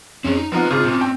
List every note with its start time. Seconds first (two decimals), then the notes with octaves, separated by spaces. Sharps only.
0.24 F2 C4 C#4 G#4
0.37 D#4
0.52 F3 B3 C4 D#4 F4 F#5 A#5
0.71 G#1 C#3 F4 G#4
0.85 A#2 C4 C#4
1.01 G5